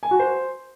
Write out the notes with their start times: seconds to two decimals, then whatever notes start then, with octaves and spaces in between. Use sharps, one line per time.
0.03 G#5
0.11 F#4
0.19 C5